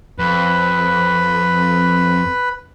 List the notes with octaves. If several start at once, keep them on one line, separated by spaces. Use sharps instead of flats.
F2 B4